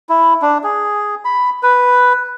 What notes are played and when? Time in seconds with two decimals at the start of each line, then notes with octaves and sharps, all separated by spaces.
0.09 E4
0.42 D4
0.64 G#4
1.25 B5
1.63 B4